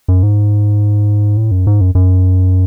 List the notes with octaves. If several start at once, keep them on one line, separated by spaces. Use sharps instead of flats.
F#2
G#2
A2
F#2
G#2
F#2
F#2